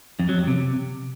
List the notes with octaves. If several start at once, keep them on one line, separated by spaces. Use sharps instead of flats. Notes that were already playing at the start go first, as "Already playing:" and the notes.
F2
F#3
F2
C3